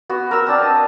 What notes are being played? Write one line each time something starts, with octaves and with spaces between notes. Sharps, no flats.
B3 F#4
A#4 E6
C4 D4 A5
D#5